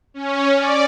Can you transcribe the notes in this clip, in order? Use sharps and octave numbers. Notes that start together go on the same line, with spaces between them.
C#4
D5